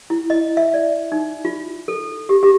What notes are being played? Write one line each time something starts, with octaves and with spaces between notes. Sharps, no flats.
E4
D#5
E5
D5
D#4
F4
A4
G4
G4